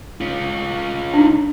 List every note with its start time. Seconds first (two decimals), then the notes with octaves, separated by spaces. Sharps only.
0.21 C#4 F4
1.14 D4 D#4